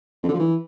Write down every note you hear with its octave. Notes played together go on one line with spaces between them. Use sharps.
F2
D3
F3
E3